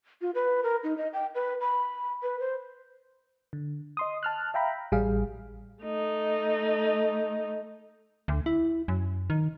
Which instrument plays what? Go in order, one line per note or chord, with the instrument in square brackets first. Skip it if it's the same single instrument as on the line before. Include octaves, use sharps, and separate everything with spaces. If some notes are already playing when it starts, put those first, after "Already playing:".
[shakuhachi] F4
B4
A#4
D#4
D#5
G5
B4
B5
B4
C5
[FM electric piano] D3
D#5 C6 D#6
A5 F6 F#6
E5 F5 G5 A#5 B5
A1 G3 G#4 F5
[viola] A3 D#4
[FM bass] D2
E4
F#2
D#3